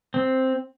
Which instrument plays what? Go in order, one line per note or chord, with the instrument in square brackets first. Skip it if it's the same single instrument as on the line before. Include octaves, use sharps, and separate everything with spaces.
[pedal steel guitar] C4